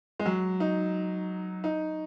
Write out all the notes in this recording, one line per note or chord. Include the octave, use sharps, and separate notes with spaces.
G#3
F#3
D#4
D#4